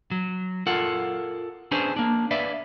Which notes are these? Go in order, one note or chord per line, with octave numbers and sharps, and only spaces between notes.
F#3
F4 A4 A#4 F#5
C#4 D4 G#4 B4 C5
A#3 D4
B4 D5 E5 F5